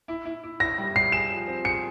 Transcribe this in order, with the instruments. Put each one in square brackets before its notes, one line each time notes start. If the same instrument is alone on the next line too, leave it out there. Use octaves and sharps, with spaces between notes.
[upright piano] E4
E4
E4
[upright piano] E4 [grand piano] A#6
[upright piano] G3
[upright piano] G3 [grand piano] C7
[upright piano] G#4 [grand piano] E7
[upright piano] F3
C4
[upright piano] G#4 [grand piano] C#7